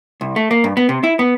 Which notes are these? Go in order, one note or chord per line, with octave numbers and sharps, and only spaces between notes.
C2
A3
A#3
G2
B3
C3
E4
B3